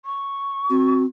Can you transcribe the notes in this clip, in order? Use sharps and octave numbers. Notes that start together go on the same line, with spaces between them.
C#6
C4 F#4